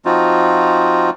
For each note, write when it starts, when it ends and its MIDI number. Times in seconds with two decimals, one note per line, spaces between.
0.05 1.10 53
0.05 1.10 60
0.05 1.10 63
0.05 1.10 65
0.05 1.10 66